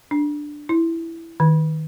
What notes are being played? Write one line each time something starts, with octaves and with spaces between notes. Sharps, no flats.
D4
E4
D#3